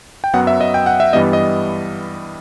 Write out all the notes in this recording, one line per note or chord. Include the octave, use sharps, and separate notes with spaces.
G5
F#2 F#3 B3 F#5
E5
D#5
G5
F#5
E5
G2 E3 G3 B3 D#5
D#5